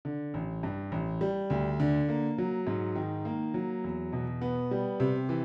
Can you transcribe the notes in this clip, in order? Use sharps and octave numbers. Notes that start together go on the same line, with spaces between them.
D3
A1
G2
A1
G3
D2
D3
A#3
F#3
G#2
D#3
A#3
F#3
E2
B2
B3
G3
C3
E3